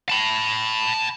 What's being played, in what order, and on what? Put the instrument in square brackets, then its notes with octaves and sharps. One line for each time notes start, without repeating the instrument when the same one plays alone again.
[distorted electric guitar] A5 B5